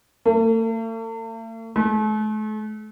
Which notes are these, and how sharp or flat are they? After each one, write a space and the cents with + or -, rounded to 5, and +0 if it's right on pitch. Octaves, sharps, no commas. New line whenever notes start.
A3 +45
A3 -40